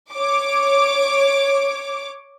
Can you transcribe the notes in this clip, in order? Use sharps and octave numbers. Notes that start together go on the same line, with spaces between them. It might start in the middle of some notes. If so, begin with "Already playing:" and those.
C#5 D6